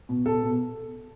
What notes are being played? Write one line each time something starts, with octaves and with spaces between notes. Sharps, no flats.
B2
B2 A4
B2